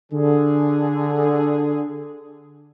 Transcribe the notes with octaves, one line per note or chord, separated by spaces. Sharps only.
D3 G#4